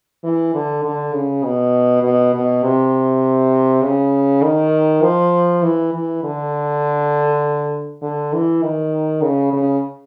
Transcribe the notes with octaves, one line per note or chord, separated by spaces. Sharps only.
E3
D3
D3
C#3
B2
B2
B2
C3
C#3
D#3
F3
E3
E3
D3
D3
E3
D#3
C#3
C#3